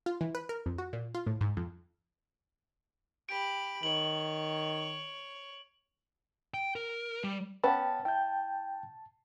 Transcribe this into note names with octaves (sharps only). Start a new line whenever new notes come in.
F4
E3
B4
A#4
F2
F#4
A#2
F4
A2
G#2
F2
G4 B5 D7
D#3 C#5 F#7
G5
A#4
G3
B3 C#4 B4 G5 A5
E4 G5 G6